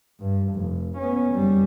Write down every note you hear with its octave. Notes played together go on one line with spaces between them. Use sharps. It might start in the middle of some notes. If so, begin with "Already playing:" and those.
G2
F1
B3 C#4
F#1 G3